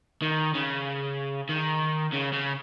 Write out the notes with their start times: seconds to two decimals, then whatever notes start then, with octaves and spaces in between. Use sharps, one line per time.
0.22 D#3
0.55 C#3
1.49 D#3
2.12 C#3
2.33 C#3